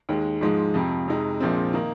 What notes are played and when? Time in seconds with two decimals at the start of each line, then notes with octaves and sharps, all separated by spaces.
0.09 D#2 D#3 G#3
0.41 G#2 F3 G#3 D#4
0.74 F2 C3 F3
1.08 F2 C3 G#3 D#4
1.40 A#1 A#2 F3 G#3 C4
1.73 D#3 A#3 D#4